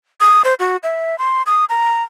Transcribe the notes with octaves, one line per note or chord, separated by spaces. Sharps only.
D#6
C5
F#4
E5
C6
D#6
A#5